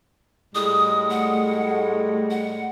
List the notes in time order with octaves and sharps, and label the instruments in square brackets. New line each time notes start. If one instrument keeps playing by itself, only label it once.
[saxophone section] A2 G3 G#3 [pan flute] D#6
[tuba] A3 [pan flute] F#5
[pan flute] F#5